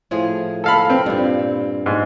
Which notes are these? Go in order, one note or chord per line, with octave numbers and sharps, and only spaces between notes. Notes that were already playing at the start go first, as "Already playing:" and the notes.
A2 F3 G#4
A4 F5 B5
C4
G2 A#2
G#2